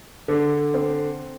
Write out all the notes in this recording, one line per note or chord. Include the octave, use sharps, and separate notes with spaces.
D3
C4